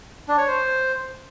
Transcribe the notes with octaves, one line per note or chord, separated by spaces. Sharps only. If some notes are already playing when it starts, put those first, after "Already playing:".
D4
C#5
C5